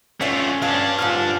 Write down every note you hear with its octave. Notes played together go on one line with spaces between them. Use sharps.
A3 C#4 F4 D5 E5 F#5
G2 D4 F5 A5
G#2 D3 F3 F6